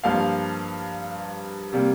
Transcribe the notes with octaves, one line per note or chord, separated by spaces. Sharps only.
G2 F3 A#3 F5
C3 G3 A#3